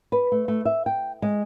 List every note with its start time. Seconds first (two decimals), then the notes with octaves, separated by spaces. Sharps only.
0.12 B4
0.32 A3
0.48 A3
0.65 E5
0.86 G5
1.22 G#3